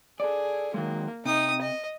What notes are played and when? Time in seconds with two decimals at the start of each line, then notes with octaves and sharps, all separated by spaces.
0.20 G#4 A4 D5
0.74 D#3 F#3 G#3 A#3
1.25 C3 D#4 D#6
1.61 D#5